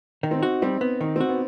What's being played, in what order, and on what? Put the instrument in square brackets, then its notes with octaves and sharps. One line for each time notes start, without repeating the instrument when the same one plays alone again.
[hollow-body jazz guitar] D#3 [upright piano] D#4
[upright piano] C4
[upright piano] D#4 [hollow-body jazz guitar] F#4
[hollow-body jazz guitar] G3 [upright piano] C4
[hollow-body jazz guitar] B3
[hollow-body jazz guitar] D#3 [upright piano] D#4
[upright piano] C4 [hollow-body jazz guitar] F#4
[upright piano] B3